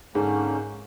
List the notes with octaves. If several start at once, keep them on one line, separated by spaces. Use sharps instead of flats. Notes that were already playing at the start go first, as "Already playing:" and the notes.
G#2 D3 A#3 C#4